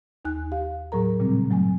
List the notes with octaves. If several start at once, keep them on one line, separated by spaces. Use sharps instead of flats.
D#2 D#4 G#5 F#6
G4 F5
A2 F#3 G#4 A#4 A#5
A#2 C#3 G3 C4
G2 F#3 A3 G#5